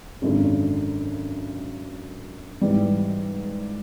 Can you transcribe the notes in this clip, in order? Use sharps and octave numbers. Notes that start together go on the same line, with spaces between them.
G#1 F#2 D3
G#2 E3 G3